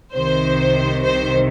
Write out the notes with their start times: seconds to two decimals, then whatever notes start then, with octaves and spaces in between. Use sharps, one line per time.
0.14 C2 C3 D#3 C5
1.03 C5